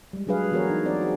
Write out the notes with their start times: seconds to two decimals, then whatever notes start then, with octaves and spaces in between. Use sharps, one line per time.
0.13 G3 G#3
0.27 F#3 D4 G#4 B4 F5
0.52 E3 B3 F#4 G#4 A#4 C#5
0.70 D#4
0.85 C4 D#4 C5 D5
1.01 F#4 G#4